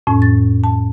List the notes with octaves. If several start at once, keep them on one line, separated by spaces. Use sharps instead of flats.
F2 A2 C#4
A6
A5